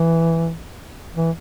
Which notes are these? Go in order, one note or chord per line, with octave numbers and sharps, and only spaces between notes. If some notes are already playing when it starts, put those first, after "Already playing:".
Already playing: E3
E3